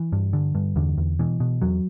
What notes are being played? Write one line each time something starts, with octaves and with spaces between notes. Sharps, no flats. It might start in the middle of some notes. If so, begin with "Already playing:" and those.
Already playing: E3
G2
D3
G2
E2 D3
E2
B2 E3
B2
E2 F#3